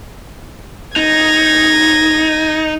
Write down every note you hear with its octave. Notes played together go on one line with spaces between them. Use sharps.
D#4 G#6 A#6